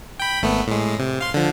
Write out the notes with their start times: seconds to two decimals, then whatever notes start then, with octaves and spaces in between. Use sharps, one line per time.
0.20 G5 B5
0.42 G#1 A3 B3
0.67 A2 G#3
0.99 C3
1.21 F5 C6
1.34 D3 F3